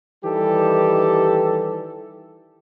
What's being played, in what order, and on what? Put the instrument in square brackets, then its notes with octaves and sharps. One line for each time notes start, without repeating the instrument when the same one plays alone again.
[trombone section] D#3 E3 G3 G4 A4